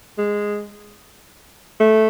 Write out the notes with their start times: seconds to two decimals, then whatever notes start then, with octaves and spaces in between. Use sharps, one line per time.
0.18 G#3
1.80 A3